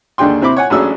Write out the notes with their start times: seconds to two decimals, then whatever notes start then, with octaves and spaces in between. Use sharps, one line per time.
0.18 D#2 D3 D4 G#4 G5 C6
0.42 C3 C4 E4 B5 D6
0.57 C#5 F#5 G#5
0.70 A1 F#3 C#4 D4 G#4 E6